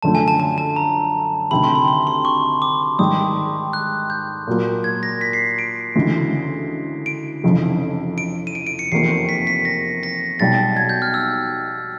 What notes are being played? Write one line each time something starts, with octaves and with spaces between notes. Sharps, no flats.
F#2 D3 F3 A3 A5
G#5
A5
A5
A5
A#5
D2 C3 D#3 B5
C6
B5
C6
C6
C#6
D6
G#2 D#3 G3 D#6
F#6
G6
A#2 F#3 A#3
G#6
A#6
B6
C7
D7
D2 C#3 E3 G#3
D7
F1 F2 C#3 E3
D7
D#7
D7
D7
C#7
F1 E2 C3 F3 A#3 C7
B6
B6
A#6
A#6
B1 B2 G3 A6
G#6
G6
F6
E6